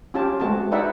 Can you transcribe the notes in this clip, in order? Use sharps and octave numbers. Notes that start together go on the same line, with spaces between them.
C#4 F4 G4 A5
G#3 A3 C4 F#4 A5
D#4 E4 B4 D5 E5 F#5